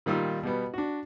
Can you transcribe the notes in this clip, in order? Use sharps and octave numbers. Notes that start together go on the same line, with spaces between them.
A#2 D#3 G3 F4 E6
B2 G3 B3
D4 F#4